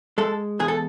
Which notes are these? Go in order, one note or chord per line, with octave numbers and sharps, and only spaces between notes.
G#3 A4
E2 G#4
A4